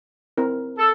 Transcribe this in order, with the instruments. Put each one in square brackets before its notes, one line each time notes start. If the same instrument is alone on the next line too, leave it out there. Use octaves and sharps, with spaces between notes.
[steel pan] C4 E4 A#4
[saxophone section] A4